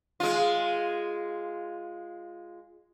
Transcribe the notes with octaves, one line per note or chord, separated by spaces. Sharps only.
G#3 F4